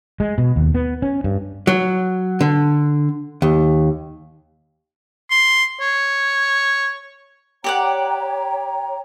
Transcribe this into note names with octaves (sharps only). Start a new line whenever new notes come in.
G#3
B2
D#2
B3
C#4
G2
F#3
D3
D#2
C6
C#5
G4 C#5 D5 F#5 G5 A#5